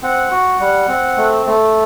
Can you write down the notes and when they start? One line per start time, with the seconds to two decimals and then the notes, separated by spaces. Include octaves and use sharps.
0.03 C4 F#5
0.31 F#4
0.60 G3
0.88 C4
1.17 A3
1.46 A3